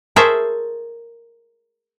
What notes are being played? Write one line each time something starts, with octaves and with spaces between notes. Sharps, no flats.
G#4 A#4 C5 C#5 E5 A5